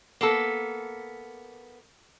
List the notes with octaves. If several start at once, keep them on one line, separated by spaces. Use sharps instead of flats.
A#3 B3 A4